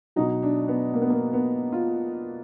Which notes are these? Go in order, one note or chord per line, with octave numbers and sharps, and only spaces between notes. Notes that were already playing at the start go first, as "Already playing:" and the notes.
B2 F#3 D#4
D4
B3
A#3
B3
A#3
B3
F4